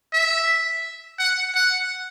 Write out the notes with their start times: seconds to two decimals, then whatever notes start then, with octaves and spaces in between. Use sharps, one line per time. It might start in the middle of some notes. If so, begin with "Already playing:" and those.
0.13 E5
1.19 F#5
1.55 F#5